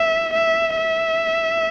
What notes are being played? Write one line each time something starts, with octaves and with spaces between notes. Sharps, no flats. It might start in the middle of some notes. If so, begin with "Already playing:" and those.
Already playing: E5
E5
E5